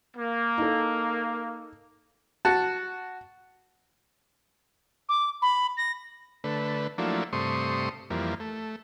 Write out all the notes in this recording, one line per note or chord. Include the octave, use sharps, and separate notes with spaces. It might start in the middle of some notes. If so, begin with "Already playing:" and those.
A#3
D#4 A4
F#4 A5
D6
B5
A#6
D3 A3 B4
F3 F#3 A3 A#3 D4 E4
G2 C3 A3 C6 C#6 D#6
F2 E3 G3 A#3
A3